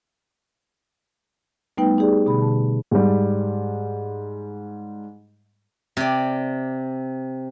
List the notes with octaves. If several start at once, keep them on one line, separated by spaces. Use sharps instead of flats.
G3 A3 B3 D#4 B4 G5
D#4 G4 G#4 D5
B2 D3 B5
A5
G#2 G3
C3 D5